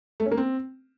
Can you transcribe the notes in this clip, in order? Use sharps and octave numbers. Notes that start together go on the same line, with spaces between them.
A3
C#4
A#3
C4